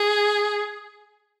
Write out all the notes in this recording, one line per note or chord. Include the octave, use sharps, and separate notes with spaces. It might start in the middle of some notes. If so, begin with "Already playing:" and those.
Already playing: G#4